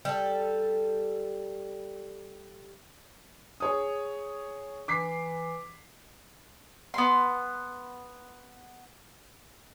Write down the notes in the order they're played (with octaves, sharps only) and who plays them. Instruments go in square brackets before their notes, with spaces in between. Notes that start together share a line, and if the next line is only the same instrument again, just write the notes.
[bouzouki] G3 A4
[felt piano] G#4 C#5 D#6
[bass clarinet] E3 [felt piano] D6 B6 C7
[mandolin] B3 C6